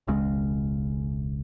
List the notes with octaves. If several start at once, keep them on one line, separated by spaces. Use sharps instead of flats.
E1 C#2 C#3 G#3